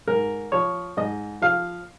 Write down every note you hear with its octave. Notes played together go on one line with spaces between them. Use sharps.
G#2 A#4
F3 C#5
G#2 D#5
F3 F5